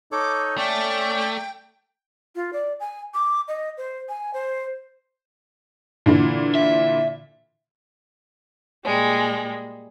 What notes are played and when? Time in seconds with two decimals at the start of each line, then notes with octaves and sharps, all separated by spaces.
0.12 D#4 A4 C#5 D6
0.58 A3 C#4 D5 G5
2.36 F4
2.53 D5
2.80 G#5
3.14 D6
3.48 D#5
3.78 C5
4.09 G#5
4.34 C5
6.06 A#2 D3 E3
6.55 E5
8.84 A#2 G3 G#3